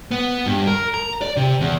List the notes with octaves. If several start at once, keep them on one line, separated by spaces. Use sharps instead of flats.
B3
G2
A#4
A#5
D5
C3
E2